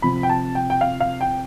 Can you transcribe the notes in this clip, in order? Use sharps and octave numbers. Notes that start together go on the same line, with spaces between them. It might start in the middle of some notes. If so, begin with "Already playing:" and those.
C3 F3 C4 B5
G5
A5
G5
G5
F5
F5
G5